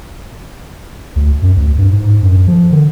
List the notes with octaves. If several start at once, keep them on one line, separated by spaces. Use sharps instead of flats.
D2
F#2
D2
G2
G#2
F#2
F3
D3